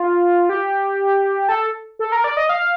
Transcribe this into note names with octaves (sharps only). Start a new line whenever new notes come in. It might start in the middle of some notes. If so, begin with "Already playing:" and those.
Already playing: F4
G4
A4
A4
A#4
D5
D#5
F5